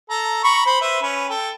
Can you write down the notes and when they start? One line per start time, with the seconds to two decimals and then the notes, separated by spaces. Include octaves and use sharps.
0.10 A4 A#5
0.44 A#5 B5 C#6
0.66 C5 B5
0.81 B4 C5 E5
1.02 C#4 B4
1.30 A4 G5